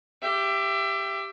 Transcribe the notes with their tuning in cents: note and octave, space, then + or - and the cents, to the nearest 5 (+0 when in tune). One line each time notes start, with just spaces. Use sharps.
G4 +0 E5 +30